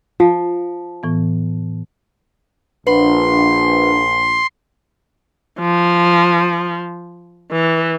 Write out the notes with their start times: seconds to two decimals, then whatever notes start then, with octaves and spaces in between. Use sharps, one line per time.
0.20 F3 F4
1.03 A2 E3 B3
2.87 A#1 D4 B4 F#5 B5 C6
5.59 F3
7.51 E3